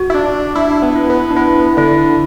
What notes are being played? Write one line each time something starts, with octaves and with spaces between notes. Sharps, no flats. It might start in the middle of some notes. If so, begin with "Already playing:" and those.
Already playing: F#4
E4
D4
D4 E4
D4
B3
E4
B3
D4
B3 E4
D3 E4